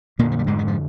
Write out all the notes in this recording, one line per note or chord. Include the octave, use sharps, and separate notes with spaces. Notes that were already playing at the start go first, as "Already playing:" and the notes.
F2 A#2 D3 A#3
F3
G3
G#2 G#3
D#3
F3